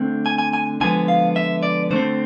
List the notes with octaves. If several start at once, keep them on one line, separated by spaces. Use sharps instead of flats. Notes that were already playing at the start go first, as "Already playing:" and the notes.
Already playing: D3 A3 C4
G#5
G#5
G#5
D3 F3 G#3 B3 G#5
F5
E5
D5
D3 A3 C4 C5